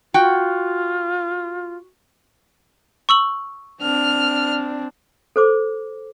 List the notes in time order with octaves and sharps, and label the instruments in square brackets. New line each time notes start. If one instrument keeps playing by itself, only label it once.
[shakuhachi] F4 [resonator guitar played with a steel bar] F#4 G5
[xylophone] C#6 E6 F#7
[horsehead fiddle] C4 D4 [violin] F6
[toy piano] A4 C5 D6